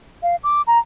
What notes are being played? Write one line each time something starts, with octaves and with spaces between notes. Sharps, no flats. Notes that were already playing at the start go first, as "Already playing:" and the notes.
F5
D6
A#5